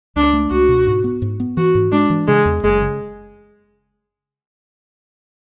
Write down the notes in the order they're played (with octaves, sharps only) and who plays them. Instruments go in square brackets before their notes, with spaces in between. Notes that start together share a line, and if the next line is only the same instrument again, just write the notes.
[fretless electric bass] C#2 [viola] D4
[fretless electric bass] A3
[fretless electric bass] C#2 [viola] F#4
[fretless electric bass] B2
G#2
B3
G#2
B3
[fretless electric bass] E3 [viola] F#4
[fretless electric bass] G#2
[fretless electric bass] G#3 [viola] D4
[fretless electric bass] E3
[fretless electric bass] C#3 [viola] G#3
[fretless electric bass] E2
[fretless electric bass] F#1 [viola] G#3
[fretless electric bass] C#3